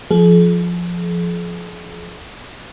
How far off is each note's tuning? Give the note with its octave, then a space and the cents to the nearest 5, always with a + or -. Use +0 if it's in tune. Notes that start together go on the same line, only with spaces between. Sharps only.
F3 +0 G#4 +45